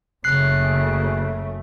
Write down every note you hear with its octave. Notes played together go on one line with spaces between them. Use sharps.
F#1 C#3 A3 F#6 C7